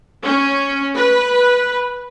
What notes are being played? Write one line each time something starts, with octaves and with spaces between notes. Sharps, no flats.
C#4
B4